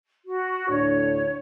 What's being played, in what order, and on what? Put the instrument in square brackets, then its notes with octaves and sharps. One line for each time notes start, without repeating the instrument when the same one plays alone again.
[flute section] F#4
[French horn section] D2 A2 D4 [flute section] C#5